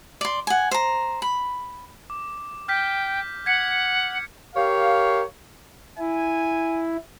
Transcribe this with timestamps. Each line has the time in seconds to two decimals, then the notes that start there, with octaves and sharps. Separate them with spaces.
0.21 D5 C6
0.47 F#5 G#5
0.71 C5 A#5
1.22 B5
2.10 D6
2.68 G5 F6 G6 B6
3.46 F#5 G#6 B6 C#7
4.55 G4 A#4 C#5 F5
5.98 E4 G#5